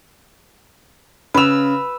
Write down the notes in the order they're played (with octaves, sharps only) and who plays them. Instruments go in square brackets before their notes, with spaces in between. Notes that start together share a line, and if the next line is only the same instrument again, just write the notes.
[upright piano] C#3 F7 [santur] B4 E6